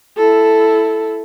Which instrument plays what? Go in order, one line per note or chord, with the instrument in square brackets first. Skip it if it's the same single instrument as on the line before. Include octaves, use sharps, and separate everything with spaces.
[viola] E4 A4